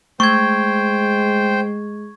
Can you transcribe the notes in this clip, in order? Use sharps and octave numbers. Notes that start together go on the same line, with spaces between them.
G#3 A3 C5 G5 C#6 G#6